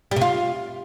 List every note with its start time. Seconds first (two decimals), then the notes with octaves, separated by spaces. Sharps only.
0.11 G3
0.16 C3
0.21 F4